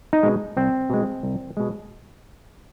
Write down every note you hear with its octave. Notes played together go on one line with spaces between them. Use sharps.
D#4
B2 G#3
C2 C4
B2 G#3
C2
B2 G#3